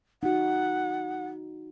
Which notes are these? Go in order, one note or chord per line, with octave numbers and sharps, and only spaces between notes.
D#4 F#4 F#5